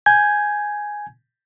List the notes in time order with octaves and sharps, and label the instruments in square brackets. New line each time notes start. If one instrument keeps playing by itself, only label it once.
[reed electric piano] G#5 G6 G#6